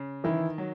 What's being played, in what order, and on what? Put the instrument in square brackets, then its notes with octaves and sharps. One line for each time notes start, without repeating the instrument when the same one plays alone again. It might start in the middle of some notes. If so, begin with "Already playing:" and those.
Already playing: [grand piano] C#3
[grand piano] D#3 [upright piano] E3 E4
[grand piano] F#3